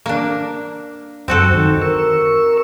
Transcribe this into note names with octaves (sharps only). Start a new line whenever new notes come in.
A#3 D4
F#2 C4 F#4 A4
D#3
A#4 C#6 E6